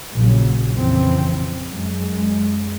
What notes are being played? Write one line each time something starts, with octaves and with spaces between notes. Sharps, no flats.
A#1 A#2 C#3 F#3
F2 C#3 E3 C4
F#2 G#3